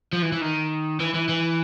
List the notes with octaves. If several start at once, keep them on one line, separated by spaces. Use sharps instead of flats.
F3
E3
E3
D#3
E3
E3
E3